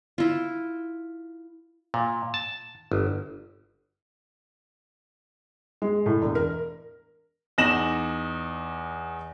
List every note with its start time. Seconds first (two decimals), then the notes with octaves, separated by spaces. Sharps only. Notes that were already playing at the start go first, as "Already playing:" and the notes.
0.18 E4 F4
1.94 A#2
2.34 A5
2.92 G1
5.82 G#3
6.06 A2
6.22 E1
6.35 A#4
7.58 E2 D#4 A#6 E7 F#7